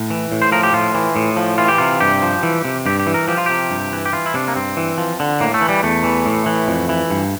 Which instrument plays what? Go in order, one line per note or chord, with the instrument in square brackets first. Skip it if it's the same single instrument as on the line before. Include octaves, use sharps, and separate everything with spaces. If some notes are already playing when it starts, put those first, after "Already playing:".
Already playing: [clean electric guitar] A2
E3
A2
C5
F3 A#4
G4
A2 F4
E3
A2
F3
E3 F4
G4
C3 F4
G2 G4
F3
E3
C3
G2 G4
G4
E3
A#4
F3 G4
F4
C3 G4
G2
E3
G4
E3 F4
E4
C3 D4
A#3
G2 C4
E3
F3
D3
A2 A#3
A3
E3
G3
E2 A3
E3
A2
E3
F2
E3
G2